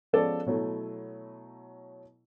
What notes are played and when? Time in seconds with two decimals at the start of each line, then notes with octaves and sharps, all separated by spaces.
0.13 F3 G#3 B3 C#4 A4 D5
0.46 B2 F#3 A3 E4